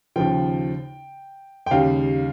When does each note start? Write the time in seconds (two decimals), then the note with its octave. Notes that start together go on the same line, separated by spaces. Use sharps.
0.16 D#2 C#3 F3 G5
1.66 G5
1.71 D#2 C#3 G3 F5